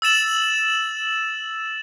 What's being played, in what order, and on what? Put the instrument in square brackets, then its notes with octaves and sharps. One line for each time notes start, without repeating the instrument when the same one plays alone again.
[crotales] E6 A6 E7 F#7